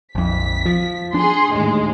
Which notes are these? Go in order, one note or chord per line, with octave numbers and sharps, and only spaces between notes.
A#1 F2 B6
F3
D4 G#4 C6
D#2 A2 G#3